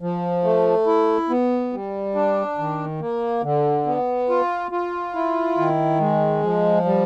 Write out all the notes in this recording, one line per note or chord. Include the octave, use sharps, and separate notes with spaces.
F3
A3
E4
B3
G3
D4
D#3
A#3
D3
B3
F4
F4
E4
D#3
G#3
F3
G3